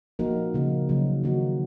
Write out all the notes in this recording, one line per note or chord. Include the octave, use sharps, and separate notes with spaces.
F3 A#3 D#4 F#4 A#4
C#3 F3 A#3
C#3 F#3 A#3 D#4
D#3 A#3 D#4 F#4